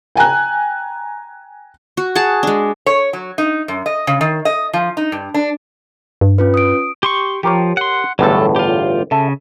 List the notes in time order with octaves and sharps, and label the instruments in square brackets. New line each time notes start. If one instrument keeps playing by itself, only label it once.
[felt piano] G5 G#5 A#5 F#6
[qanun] F#4
G#4 F#5 A5
G#3 D4
[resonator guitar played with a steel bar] C#5
F#3
D#4
F#2
D#5
C#3
D#3
D#5
F3
D#4
G2
D4
[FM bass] G2
[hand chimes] C#4 F4 B4
D#6 D7
[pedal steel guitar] G4 C6 C#6
[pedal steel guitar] F3 [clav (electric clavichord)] G4 A#4 C#5
[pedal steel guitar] F#5 C6
[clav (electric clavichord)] G1 E2 A2 [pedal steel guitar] F#3 A4
[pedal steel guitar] F4 G4
[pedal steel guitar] C#3 [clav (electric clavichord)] A4 E5